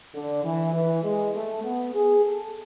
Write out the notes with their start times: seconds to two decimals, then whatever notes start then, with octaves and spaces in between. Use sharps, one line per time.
0.14 D3
0.44 E3
0.73 E3
1.03 G#3
1.34 A3
1.64 B3
1.95 G#4
2.24 A4